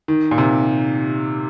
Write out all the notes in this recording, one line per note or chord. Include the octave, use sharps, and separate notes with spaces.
D#3
A#2
C3